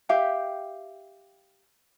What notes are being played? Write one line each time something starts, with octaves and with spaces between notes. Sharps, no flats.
G4 E5 F5 G5